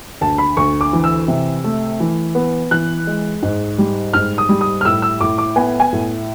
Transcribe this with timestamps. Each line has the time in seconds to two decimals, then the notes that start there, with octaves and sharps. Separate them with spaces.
0.21 D2 A5
0.38 B5
0.57 D2 C#6
0.81 D6
0.93 E3
1.04 E6
1.28 C3
1.64 A3
2.00 E3
2.35 B3
2.71 E3 F#6
3.07 G#3
3.43 G#2
3.78 G3
4.13 G#2 F6
4.38 D#6
4.49 G3
4.61 D#6
4.81 F6
4.85 A2 E6
5.02 E6
5.21 A2 D6
5.38 D6
5.56 B3 G#5
5.80 G#5
5.93 A2